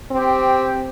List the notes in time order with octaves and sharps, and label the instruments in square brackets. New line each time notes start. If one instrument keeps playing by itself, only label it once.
[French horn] C4 [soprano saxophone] G4